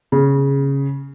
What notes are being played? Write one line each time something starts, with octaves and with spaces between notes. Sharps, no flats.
C#3